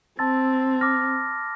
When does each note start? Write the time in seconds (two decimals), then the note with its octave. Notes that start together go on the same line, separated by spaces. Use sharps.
0.19 C4 A5 C6 E6 A6
0.81 D6 F6 A#6